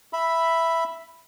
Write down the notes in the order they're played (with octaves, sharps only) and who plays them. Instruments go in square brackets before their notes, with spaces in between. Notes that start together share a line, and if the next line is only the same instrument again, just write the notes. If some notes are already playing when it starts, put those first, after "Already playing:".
[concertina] E5 B5